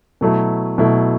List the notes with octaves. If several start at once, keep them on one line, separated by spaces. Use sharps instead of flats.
B2 F#3 A3 E4
B2 F#3 A3 E4